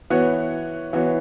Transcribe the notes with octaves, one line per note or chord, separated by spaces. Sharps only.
E3 B3 F#4 C#5
E3 B3 F#4 C#5